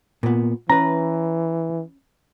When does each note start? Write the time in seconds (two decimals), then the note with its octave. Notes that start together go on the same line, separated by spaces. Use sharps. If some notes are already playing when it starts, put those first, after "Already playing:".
0.23 A#2 B3
0.70 E3 C#4 B4 A#5